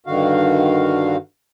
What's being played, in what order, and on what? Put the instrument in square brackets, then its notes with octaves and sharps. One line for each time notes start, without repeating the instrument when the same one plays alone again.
[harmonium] G2 D3 D#3 F#4 F5